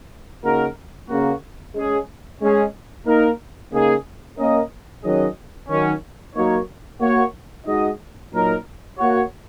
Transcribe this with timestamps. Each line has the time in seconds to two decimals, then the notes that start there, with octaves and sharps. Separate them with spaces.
0.44 C#3 A#3 D#4 F#4 A#4
1.09 C#3 A#3 F#4
1.75 G#3 C#4 G#4
2.41 G#3 C#4 G#4
3.07 A#3 D#4 A#4
3.72 C#3 A#3 D#4 G#4
4.38 A#3 C#4 A#4 D#5
5.03 D#3 F#3 C#4 G#4 D#5
5.69 D#3 F#3 C#4
6.35 F#3 A#3 D#4 A#4 C#5
7.01 A#3 F#4 C#5
7.66 G#3 D#4 F#4 D#5
8.32 A#2 F#3 D#4 A#4
8.98 A#3 F#4 C#5